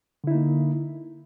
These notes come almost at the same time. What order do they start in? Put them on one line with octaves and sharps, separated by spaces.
D3 E4 D#4 A#3